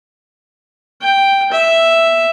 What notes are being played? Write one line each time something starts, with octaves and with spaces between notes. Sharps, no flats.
G5
E5